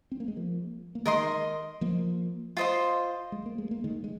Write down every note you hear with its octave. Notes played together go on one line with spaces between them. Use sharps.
C4
A#3
G#3
F3 A#3
A#3
D#3 G#3 A#4 D#5 C6
F3 A#3
F4 C5 D#5 C6
G#3
A#3
G#3
A#3
D#3 G#3
G#3